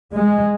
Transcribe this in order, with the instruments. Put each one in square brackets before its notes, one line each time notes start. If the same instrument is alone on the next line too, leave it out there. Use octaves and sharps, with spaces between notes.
[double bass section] G#3